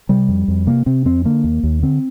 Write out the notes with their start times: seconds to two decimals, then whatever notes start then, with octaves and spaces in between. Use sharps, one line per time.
0.09 C3 G3
0.29 F2
0.48 F2
0.67 C3 A#3
0.86 C3 C4
1.05 F2 C4
1.25 D3 A#3
1.44 D#2
1.63 D#2
1.83 D3 C4